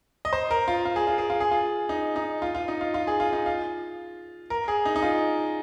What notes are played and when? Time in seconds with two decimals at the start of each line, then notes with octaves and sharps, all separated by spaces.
0.25 D#5
0.33 C5
0.51 A#4
0.68 F4
0.85 F4
0.96 G#4
1.07 F4
1.18 G#4
1.30 F4
1.40 G#4
1.51 F4
1.89 D#4
2.16 D#4
2.42 F4
2.55 F4
2.68 D#4
2.81 F4
2.94 F4
3.07 G#4
3.20 F4
3.33 D#4
3.46 F4
4.50 A#4
4.68 G#4
4.85 D#4
4.96 D#4
5.02 F4